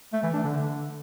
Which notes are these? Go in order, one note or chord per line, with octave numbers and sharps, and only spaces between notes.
A3
E3
D4
D3